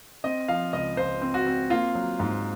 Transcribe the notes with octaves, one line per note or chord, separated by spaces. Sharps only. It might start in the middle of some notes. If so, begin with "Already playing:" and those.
C4 D#5
F3 F5
C#2 D#5
C#2 C5
C4
F#4
C4
A#3 F4
F#3
G#2